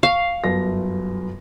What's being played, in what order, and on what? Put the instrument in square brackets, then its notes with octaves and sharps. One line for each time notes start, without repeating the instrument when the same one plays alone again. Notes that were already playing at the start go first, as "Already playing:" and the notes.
[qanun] F5 [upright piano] C#6
[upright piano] G1 F#2 A#6